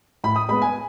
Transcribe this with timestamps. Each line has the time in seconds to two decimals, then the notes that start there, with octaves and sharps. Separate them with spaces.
0.24 A2 B5
0.36 D#6
0.49 G#3 B3 B5
0.62 G#5